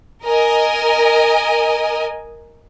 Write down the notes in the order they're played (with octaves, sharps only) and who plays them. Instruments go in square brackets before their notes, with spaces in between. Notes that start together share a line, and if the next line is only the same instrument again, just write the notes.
[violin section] A#4 D#5 G#5